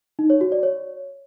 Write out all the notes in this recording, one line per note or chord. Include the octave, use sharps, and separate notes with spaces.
D#4
C#5
F#4
D5
C#5